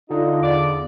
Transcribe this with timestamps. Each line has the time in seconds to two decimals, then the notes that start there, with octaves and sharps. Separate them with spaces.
0.10 D3 D#4 F4 D#5
0.43 E2 D5